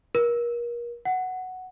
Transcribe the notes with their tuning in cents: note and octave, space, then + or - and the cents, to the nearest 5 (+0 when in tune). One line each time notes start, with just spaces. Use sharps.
A#4 +35
F#5 +5